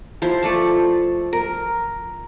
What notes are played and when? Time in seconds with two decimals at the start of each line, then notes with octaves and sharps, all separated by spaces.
0.22 F3 E4 C5 C6
0.43 A3 D5 A5
1.33 A#4